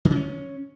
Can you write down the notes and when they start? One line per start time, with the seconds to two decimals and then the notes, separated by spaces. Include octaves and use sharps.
0.05 D3
0.10 C#3
0.16 C#4